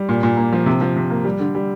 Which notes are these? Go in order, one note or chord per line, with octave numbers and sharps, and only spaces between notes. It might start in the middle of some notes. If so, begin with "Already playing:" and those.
Already playing: G3
A#2
A#2
A#3
F3
C3
F3
C3
A#3
G3
D3
G3